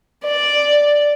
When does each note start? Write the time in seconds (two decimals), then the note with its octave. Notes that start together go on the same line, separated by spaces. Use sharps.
0.24 D5